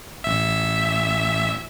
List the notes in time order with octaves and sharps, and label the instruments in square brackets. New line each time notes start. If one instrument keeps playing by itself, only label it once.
[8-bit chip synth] A1 E5